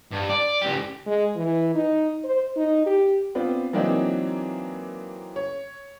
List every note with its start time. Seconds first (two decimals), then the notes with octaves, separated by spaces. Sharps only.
0.12 G2
0.30 D5
0.62 C#2 G4
1.06 G#3
1.36 E3
1.75 D#4
2.24 C5
2.56 D#4
2.86 G4
3.35 B3 C4 D4 F4
3.73 E3 F#3 A#3 C4 D4 D#4
5.36 C#5